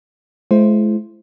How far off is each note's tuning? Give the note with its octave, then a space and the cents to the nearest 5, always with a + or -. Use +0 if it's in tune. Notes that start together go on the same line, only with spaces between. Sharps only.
G#3 +45 E4 +35 C5 +0